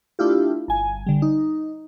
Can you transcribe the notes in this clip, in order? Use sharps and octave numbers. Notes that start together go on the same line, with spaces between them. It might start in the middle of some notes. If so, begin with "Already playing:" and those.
A3 D4 E4 F4 G4
G1 G#5
D3 G3
D#4